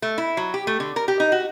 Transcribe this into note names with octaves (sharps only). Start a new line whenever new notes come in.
A3
E4
F#3
G4
A3
D3
A#4
G4
D#4
F#4